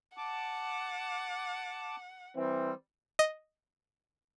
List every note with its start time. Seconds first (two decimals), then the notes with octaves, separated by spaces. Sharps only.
0.17 F#5 A5 D6
2.36 E3 G3 C4
3.19 D#5